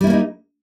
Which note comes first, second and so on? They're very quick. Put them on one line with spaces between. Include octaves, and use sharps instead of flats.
G3 E4 A#3 C#4 D#4